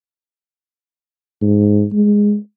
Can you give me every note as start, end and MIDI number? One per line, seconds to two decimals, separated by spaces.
1.41 1.85 44
1.92 2.36 56